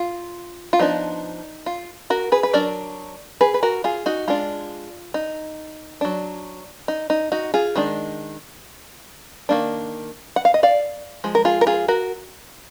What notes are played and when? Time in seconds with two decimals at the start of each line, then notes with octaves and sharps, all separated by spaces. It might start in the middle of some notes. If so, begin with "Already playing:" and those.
Already playing: F4
0.73 F4
0.79 F3 B3 D4 D#4
1.66 F4
2.10 F#4 A#4
2.32 G#4 B4
2.43 B4
2.53 F#3 D4 A#4 D5
3.41 G#4 B4
3.54 B4
3.63 F#4 A#4
3.84 F4 G#4
4.06 D#4 F#4
4.28 G#3 D4 F4
5.14 D#4
6.01 F#3 D4
6.88 D#4
7.10 D#4
7.32 D#4 F#4
7.54 F4 G#4
7.76 D#3 G#3 D4
9.49 D#3 A#3 D4
10.36 F#5
10.45 F5
10.54 D#5
10.63 D5 F5
11.24 F3 G#3
11.35 A#4
11.45 F4 G#4
11.61 A#4
11.67 F4 G#4
11.88 F#4 A#4